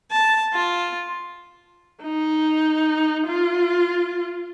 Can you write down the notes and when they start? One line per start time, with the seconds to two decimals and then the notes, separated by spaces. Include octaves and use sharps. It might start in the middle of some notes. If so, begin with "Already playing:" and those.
0.11 A5
0.53 F4
2.02 D#4
3.26 F4